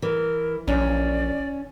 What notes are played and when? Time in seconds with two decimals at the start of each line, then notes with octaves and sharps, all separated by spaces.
0.02 E3 A#4
0.68 A#1 C#4 D5